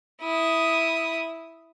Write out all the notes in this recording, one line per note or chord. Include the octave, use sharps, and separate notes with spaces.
E4 D#6